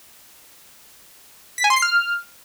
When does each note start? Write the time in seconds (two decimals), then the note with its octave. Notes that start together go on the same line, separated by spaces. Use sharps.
1.58 B6
1.64 G#5
1.70 C6
1.76 C7
1.82 F6